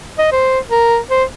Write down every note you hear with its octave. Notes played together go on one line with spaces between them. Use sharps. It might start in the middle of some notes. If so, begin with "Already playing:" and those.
D#5
C5
A#4
C5